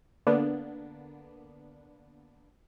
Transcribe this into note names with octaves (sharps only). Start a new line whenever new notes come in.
D3 A#3 B3 D4